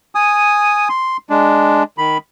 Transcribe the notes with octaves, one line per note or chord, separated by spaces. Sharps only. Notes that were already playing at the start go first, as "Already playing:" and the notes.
G#5 D#6
C6
G#3 D4
D#3 B5